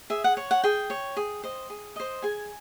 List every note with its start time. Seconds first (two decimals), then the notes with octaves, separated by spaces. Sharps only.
0.10 G#4 E5
0.24 F#5
0.37 C#5 F#5
0.51 F#5
0.64 G#4 G5
0.90 C#5
1.17 G#4
1.43 C5 D#5
1.70 G#4
1.96 C5 D#5
2.22 G#4 G#5